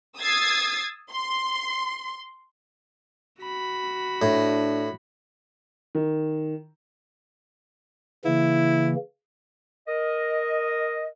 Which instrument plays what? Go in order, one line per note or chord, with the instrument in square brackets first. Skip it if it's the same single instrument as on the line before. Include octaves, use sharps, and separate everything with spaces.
[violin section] D#6 E6 G#6 A6 C7
C6
[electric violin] F#4 B5
[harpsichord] A2 [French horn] D4
[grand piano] D#3
[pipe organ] C#3 E3 A#3 [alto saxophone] E4
[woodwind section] A#4 D#5